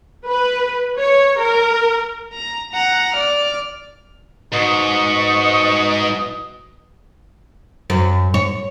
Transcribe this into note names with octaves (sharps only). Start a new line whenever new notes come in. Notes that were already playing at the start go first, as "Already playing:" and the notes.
B4
C#5
A#4
A#5
F#5 A#5
D5 F6
G#2 B2 C#6 D#6
F#2
C#5